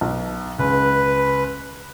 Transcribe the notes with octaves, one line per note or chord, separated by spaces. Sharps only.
B1
C#2 B4